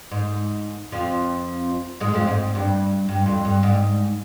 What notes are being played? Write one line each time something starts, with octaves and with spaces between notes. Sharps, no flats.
G#2
F2 F3
G#2 G#3
F2 F3
G#2
G2
G2
F2
G2
G#2